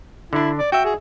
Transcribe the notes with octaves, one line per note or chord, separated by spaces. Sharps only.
D3 D4 E4
D5
F#4 E5 G5
G#4